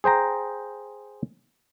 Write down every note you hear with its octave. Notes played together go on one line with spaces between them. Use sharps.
G#4 C5 G5 A#5